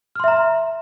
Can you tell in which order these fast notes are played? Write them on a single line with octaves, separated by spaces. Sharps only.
F6 C6 E5 A#5